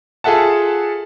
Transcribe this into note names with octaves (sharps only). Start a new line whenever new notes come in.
F4 G#4 A4 E5 F#5 A5